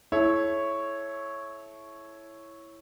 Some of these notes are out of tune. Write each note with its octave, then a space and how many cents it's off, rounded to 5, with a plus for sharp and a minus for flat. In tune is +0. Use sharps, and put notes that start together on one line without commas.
E4 +0 A4 -35 C#5 -5